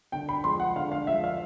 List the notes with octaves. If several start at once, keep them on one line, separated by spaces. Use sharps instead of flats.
D3 G5
B5
F3 G#3 C6
F#5
D3 F5
F5
F3 G#3 E5
F5